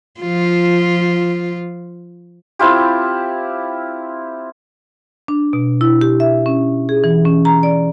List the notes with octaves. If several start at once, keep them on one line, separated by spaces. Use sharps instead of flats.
F3 F4
C4 E4 F4 G4
D4
B2
E4
G4
E5
C#4
G#4
E3
C#4
A#5
D5